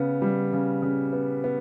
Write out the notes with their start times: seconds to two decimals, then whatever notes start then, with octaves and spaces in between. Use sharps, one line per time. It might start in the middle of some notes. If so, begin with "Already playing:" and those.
Already playing: C#3 B3
0.22 G3
0.53 C#3
0.82 C#3
1.13 B3
1.44 B3